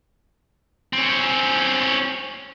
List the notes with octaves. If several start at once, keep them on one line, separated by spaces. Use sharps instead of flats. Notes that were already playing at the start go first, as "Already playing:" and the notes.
C4 C#4